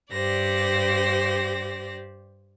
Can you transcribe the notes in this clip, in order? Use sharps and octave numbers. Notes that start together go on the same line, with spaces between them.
G2 G4 C5 D5 A#6